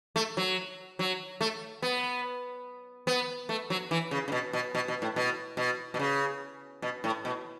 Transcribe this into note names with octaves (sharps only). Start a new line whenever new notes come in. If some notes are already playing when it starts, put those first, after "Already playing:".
A3
F#3
F#3
A3
B3
B3
A3
F#3
E3
C#3
C#3
B2
B2
B2
B2
A2
B2
B2
B2
C#3
B2
A2
B2